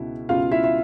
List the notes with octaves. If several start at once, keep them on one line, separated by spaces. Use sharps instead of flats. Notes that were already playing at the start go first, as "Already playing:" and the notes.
Already playing: C#2 B2 E4
C#2 B2 F4 F5
E4 E5
E5